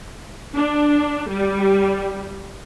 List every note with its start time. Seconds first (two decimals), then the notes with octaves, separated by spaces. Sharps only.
0.56 D4
1.30 G3